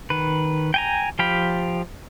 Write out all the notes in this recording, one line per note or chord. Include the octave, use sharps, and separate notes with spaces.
D#3 B4
G5 G#5 A#5
F3 G4 F5 G5 B5